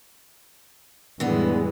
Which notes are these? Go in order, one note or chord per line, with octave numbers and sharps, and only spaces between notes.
F2 A2 D3 E3 G3 G#3 B3